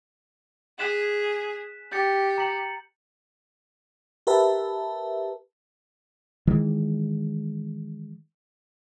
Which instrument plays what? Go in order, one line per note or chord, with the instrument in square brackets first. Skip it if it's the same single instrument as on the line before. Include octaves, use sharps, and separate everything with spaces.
[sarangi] G#4 [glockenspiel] F#6 B6 E7
[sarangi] G4 [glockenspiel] G6 A6 C#7
[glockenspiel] A#5 C#7 F#7
[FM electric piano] G4 A#4 B4 E5 A5
[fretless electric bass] D#3 E3 G#3